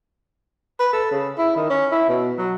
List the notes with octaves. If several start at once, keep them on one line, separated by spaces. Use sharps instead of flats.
B4
A4
C#3
E4
D#3
C#4
E4
B2
F#3